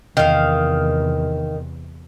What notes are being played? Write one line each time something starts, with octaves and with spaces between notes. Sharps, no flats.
E2 C3 D#3 F5